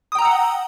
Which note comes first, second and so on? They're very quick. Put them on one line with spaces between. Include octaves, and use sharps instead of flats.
D#6 G5 A#5 E6 F#5